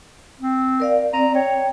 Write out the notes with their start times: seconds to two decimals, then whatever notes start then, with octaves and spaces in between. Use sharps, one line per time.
0.39 C4
0.80 A#4 D5 F5
1.13 C4 D5 A#5
1.35 C#5 G5